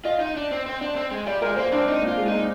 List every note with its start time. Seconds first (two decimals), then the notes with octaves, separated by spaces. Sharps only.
0.05 F4 D#5
0.21 D#4
0.36 D4
0.51 C4
0.66 C4
0.81 D4
0.96 C4
1.12 G#3
1.26 G3 D5
1.42 G#3 A#4
1.56 A#3 C5
1.72 C4 D4
1.86 C4 D#4
2.02 A#3
2.07 F4
2.17 G#3
2.27 D#4
2.32 A#3